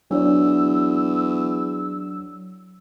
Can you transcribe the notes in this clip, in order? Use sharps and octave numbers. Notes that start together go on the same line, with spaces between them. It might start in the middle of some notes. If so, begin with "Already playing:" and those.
E2 F#3 D4 C#5 D5 E6